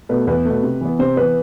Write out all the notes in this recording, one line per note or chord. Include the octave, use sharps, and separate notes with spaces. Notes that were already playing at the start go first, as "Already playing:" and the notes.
B2 A3 B4
E2 B4
B2 A3
C3
E3 B3
C3 C5
E3 B3 B4